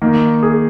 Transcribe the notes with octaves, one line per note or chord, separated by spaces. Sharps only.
D#3 A#3
G#4